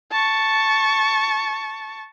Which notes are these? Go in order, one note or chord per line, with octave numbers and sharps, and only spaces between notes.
A5 C#6